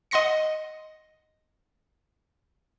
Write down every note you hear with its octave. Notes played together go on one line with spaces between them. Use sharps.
D#5 F#5 C6 A#6 C#7